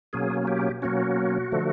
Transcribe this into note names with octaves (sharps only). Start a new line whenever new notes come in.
B2 F#3 A#3 C#4 G#4
G4
B2 F#3 A#3 C#4 F#4
D3 F3 A3